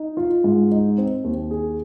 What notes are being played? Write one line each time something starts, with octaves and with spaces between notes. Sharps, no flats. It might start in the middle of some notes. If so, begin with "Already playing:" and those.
Already playing: D#4
F4
G#2
D#4
C4
D#2
G#4